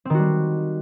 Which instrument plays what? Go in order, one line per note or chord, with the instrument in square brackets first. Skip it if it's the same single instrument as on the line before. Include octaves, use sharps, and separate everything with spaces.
[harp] C4
D#3
F#4
G3